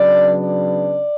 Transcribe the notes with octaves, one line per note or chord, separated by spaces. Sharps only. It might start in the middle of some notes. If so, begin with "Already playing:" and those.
Already playing: C#3 F#3 B3 D4 D5
D5